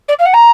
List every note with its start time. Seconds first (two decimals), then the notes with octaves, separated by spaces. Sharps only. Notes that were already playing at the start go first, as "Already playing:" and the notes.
0.08 D5
0.19 F5
0.25 F#5
0.33 A#5